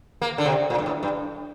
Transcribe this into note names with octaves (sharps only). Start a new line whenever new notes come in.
A#3
D3
C3
A#2
G2
A2
G2